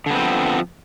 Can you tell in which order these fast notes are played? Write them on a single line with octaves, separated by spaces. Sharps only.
D3 B3 C4 F3